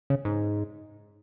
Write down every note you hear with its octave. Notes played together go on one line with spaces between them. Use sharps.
C#3
G#2